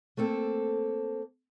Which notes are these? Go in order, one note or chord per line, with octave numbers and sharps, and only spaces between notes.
A3 A#3 C4 A4